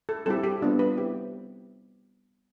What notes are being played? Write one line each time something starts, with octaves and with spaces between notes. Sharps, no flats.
A4
G3 C4 E4 G4 A4
G4
G3 B3 D4 F4
B4
C4 E4 G4